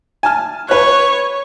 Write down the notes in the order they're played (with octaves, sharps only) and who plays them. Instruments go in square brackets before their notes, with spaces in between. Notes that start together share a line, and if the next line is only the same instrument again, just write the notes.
[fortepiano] G#5 A5 F6
[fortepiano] B4 F#6 [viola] C#5